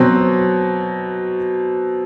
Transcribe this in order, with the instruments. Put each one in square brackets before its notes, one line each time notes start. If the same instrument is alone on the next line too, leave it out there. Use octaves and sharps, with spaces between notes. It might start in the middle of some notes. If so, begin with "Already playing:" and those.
Already playing: [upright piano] B2 F#3 C4